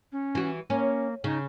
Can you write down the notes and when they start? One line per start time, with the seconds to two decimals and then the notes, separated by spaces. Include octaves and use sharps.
0.12 C#4
0.35 E3 F#4
0.70 A#3 C#4
1.24 C#3 D#4